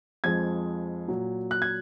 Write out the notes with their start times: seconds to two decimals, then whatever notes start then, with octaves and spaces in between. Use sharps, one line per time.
0.24 F2 F3 G#3 G#6
1.08 A#2 F#3
1.51 F#6
1.62 G#6